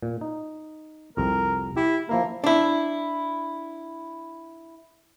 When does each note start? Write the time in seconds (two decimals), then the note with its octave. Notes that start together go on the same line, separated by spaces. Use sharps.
0.03 A#2
0.21 D#4
1.17 C2 F2 A#4
1.77 E4 G4
2.09 F3 A#3 E4 A#4
2.44 D4 E4